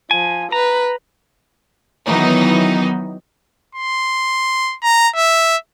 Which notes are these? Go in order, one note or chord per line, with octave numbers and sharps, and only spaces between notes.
F3 G#5
B4 A#5
D#3 E3 F#3 B3 D#4
C6
A#5
E5